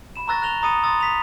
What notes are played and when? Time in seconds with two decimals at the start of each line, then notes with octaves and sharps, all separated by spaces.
0.16 B5 E7
0.28 A#5 C#6 E6 F#6 A6 A#6
0.42 F#6 A#6 F7 G7
0.62 A#5 B5 D#6 A6 C#7 D#7
0.83 B5 C6 D#6 E6 A6
1.00 B6 F7